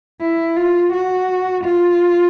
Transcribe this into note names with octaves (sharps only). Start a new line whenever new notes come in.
E4
F4
F#4
F4